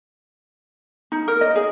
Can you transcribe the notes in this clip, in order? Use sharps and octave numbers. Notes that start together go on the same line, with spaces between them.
D#4
A#4
D#5
G#4